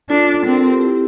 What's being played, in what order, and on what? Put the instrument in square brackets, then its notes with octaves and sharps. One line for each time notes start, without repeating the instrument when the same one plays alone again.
[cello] D4 [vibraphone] F4 A4
[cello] C4 [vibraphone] A#4
[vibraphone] A4
G4 A#4
E4 G4